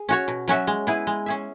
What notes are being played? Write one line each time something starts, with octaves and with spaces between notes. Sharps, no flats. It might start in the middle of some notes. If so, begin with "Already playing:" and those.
Already playing: G#4
C#4 F#4 C#5
B2
F#3 C#4 F#4 E5
G#3
B3 E4 G#4 B4
G#3
C#4 G#4 E5